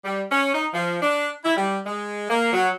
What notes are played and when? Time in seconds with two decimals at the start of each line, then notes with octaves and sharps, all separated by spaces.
0.05 G3
0.31 C#4
0.54 D#4
0.74 F3
1.01 D4
1.44 E4
1.56 G3
1.86 G#3
2.29 A#3
2.53 F#3